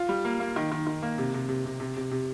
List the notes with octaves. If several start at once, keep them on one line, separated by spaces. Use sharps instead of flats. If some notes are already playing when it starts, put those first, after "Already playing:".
Already playing: F4
G3
A#3
A#3
D#3
D#3
D#3
A#3
C3
C3
C3
C3
C3
C3
C3